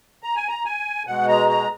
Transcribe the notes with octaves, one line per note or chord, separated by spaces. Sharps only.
A#5
G#5
A#5
G#5
B2 G#3 F#5
A#5
A#5